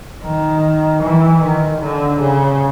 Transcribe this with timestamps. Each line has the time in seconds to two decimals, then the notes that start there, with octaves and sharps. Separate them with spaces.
0.24 D#3
1.03 E3
1.42 D#3
1.81 D3
2.20 C#3